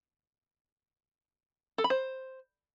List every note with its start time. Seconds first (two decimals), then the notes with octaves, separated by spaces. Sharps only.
1.78 A4
1.84 B5
1.90 C5